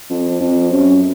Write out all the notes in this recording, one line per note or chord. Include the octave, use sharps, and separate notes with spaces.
F2
F2
F#2